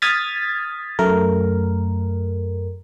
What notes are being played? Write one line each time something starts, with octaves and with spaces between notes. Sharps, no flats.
D#6 F6 G#6 A6 B6
F#2 A3 A#4